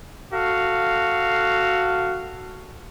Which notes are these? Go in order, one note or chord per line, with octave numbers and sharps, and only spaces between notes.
F#4 A4 F5